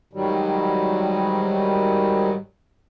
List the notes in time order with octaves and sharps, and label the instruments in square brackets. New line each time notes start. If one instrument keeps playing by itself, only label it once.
[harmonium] G#2 D#3 F#3 G3